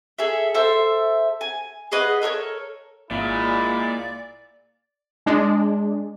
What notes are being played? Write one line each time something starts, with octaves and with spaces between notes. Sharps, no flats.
G#4 A4 E5
A4 C5 E5 A5
G#5
G#4 B4 D#5 F#5
A4 A#4 C5 C#5
G#1 A#2 G#3 E4 D5
G#3 D4